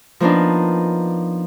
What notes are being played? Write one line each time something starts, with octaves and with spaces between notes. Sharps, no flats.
F3 A#3 B3 D4 D#4